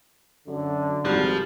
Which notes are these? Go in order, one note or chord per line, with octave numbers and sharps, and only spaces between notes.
F#2 D3
G#1 F3 G3 F#6